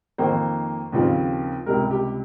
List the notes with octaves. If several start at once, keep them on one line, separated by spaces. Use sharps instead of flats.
F2 D#3 A#3 D#4 C5
D#2 C#3 F3 C4 F4
C#2 C3 G3 A#4
G4